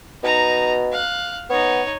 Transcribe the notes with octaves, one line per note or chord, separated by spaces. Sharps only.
B2 D#4 A#5
F5 F#6
B3 D#4 C#5